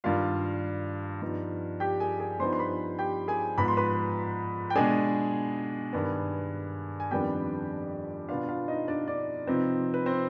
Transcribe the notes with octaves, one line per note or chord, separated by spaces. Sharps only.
G2 D#3 G3 F4 F5
G2 F3 B3 D#4
G4 G5
G#4 G#5
G#4 G#5
G2 F3 B3 D#4 C5 C6
C6
B4 B5
G4 G5
G#4 G#5
G#2 F3 B3 B5
C6
B4 B5
G5
B2 G#3 D4 G#4 G#5
G2 D#3 B3
G#5
F2 D#3 G3 B3 D4 G4 G5
B2 B3 D4 F4 F5
F4 F5
D#4 D#5
D4 D5
D4 D5
C3 F3 C4 D#4 B4
B4
C4 C5